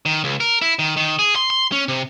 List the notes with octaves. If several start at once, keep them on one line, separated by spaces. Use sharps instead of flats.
D#3
C#2
A#4
E4
D#3
D#3
G#4
C6
C6
C#4
C3